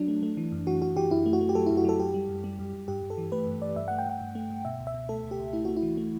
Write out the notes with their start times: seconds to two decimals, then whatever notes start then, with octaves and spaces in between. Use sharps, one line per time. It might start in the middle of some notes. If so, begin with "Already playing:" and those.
Already playing: F#3 D4
0.08 A3
0.23 A3
0.37 E3
0.52 F#2
0.67 E3 F#4
0.82 F#2 F#4
0.96 E3 G4
1.11 F#2 E4
1.26 A3
1.33 F#4
1.41 A3
1.49 G4
1.55 F#3 A4
1.66 F#2 E4
1.77 F#4
1.85 F#3 A4
1.99 F#2 G4
2.14 G3
2.29 F#2
2.44 G3
2.59 F#2
2.73 F#2
2.88 G2 G4
3.03 G2
3.10 A4
3.18 E3
3.32 A3 B4
3.47 G2
3.62 G2 D5
3.76 G2 E5
3.88 A3 F#5
3.98 G5
4.06 G2 F#5
4.21 G2
4.35 A3
4.50 G2
4.65 B2 E5
4.80 C#2
4.87 E5
4.94 B2
5.09 A3 A4
5.24 C#2
5.31 G4
5.39 C#2
5.53 A3 E4
5.65 A3 F#4
5.76 E4
5.83 E3
5.97 A3